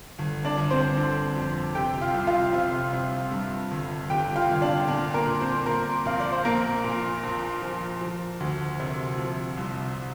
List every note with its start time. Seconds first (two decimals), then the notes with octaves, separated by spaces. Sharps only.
0.19 G1
0.45 D4 D5
0.58 G1
0.71 C4 C5
0.97 D3
1.36 F2
1.75 C3 G4 G5
2.01 F4 F5
2.14 C2
2.27 F4 F5
2.53 C3
2.93 C3
3.31 G2
3.71 G1
4.10 G1 G4 G5
4.36 F4 F5
4.49 G1
4.62 D4 D5
4.88 A#2 D4 D5
5.14 A#3 A#4
5.27 A#2
5.40 C4 C5
5.66 A#2 A#3 A#4
6.05 A#1 F5
6.20 D5
6.32 C5
6.45 A#1 A#3 A#4
6.84 A#2
7.23 A#1
7.62 F3
8.01 F3
8.40 D2
8.80 C3
9.18 F3
9.57 C2